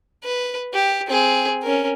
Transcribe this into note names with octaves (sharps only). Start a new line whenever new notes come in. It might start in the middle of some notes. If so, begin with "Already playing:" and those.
B4
G4
C4 G#4
C#4 A#4